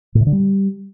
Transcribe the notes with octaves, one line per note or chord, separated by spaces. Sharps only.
A2
C3
D3
G3